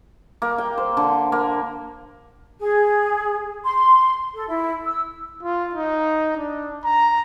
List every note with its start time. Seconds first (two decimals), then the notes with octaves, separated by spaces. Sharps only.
0.42 A#3
0.58 G5
0.78 C5
0.97 D3
1.32 A#3
2.60 G#4
3.64 C6
4.35 A4
4.47 E4
4.84 E6
5.43 F4
5.75 D#4
6.37 D4
6.84 A#5